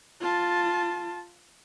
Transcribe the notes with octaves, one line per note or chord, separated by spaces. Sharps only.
F4 A5